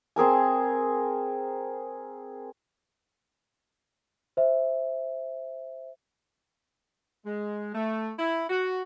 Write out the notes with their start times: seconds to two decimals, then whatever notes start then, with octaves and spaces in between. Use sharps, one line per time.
0.16 C4 G#4 A#4 G#5
4.37 C5 E5
7.25 G#3
7.75 A3
8.19 E4
8.50 F#4